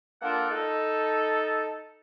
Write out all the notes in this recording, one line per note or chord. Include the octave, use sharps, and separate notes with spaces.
A#3 D4 F4 A4 F#5
D#4 A4